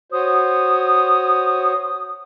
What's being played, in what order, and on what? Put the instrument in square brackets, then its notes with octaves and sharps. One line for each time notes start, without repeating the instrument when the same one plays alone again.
[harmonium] F#4 C5 C#5 [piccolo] D#6